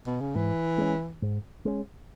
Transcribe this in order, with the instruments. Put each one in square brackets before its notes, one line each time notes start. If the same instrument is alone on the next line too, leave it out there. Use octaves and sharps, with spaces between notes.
[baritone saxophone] B2
C#3
[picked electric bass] G#2 [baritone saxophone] E3
[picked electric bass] G#3 C#4
G#2
G#3 C#4